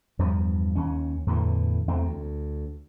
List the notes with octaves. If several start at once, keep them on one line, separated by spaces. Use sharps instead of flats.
E2 G2 F3
D#2 C#4
E2 A2 D3 E3
E2 A3 C4
D2